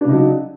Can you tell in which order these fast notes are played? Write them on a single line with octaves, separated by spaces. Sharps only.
D4 C#3 D#4 F#3